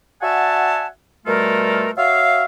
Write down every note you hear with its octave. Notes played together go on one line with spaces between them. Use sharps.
F#4 D5 E5 F#5 G#5 A5
B2 G3 A3 F4 A4 A#4
F#4 C#5 E5 F5